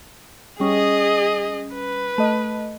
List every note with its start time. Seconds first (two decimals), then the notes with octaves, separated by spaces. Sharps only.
0.60 G3 C#4 G#4 D#5
1.75 B4
2.18 A3 D#5